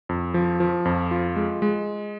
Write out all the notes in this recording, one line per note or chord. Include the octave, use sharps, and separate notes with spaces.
F2
F3
F3
F2
F4
G#3
G#3